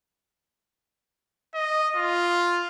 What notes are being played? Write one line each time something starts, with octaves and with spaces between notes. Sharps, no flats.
D#5
F4